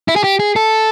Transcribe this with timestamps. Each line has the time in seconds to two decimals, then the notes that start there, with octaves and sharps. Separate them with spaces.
0.08 E4
0.16 G#4
0.24 G4
0.39 G#4
0.56 A4